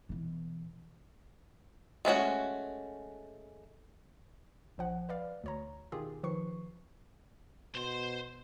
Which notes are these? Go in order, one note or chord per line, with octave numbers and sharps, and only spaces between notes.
B2 E3
G#3 A3 C#4 F#4
A#1 F3 F#5
B4 D5 F5
D2 C#5 A#5
B2 D#3 F4 G4 G#4
D#3 F3 B4 C#6 C7
B2 C5 C6